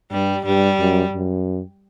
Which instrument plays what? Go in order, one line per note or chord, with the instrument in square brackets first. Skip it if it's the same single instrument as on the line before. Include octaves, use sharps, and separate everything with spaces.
[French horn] G2 [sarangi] G3
[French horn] G2 [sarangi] G3
[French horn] F#2
F#2